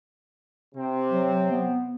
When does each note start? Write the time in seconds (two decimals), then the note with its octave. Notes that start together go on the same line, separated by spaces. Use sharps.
0.75 C3 C4
1.11 F#3
1.51 B3